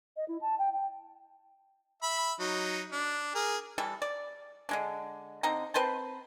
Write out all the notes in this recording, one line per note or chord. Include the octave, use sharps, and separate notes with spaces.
D#5
E4
A5
G5
G5
E5 B5
F#3 D#4
D4
G#4 A#4
E3 G3 A4
D5
D3 G#3 D4
D3 C4 D#4 A#5
C4 B4 C5 A5